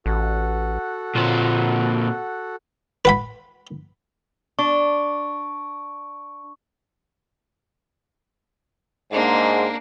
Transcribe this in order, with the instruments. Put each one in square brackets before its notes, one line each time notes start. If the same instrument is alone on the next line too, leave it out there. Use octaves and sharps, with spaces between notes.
[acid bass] A1 [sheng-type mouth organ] F#4 A4 F#5
[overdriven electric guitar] A#2 C4 [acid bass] F4
[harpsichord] B4 F#5 B5
[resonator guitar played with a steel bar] D4 [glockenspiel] C#6
[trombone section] G#2 [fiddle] A#3 D4